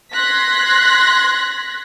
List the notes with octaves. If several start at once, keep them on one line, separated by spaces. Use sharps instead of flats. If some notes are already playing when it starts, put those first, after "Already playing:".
C6 F#6 G#6 A#6 B6